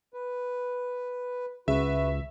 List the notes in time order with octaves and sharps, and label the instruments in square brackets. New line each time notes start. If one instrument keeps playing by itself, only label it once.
[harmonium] B4
[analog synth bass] C#2 [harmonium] F#4 B4 [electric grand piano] E5